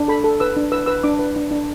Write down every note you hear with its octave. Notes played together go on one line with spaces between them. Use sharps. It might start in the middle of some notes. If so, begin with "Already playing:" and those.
Already playing: D4
A4 B5
A4
B4 E6
D4
B4 E6
B4 E6
D4 D6
B4
D4
D4